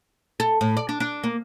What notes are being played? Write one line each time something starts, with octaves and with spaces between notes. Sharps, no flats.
A4
A2
D5
D4
D4
A#3